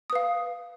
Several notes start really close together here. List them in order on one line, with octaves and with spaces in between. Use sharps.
D#6 B4 F5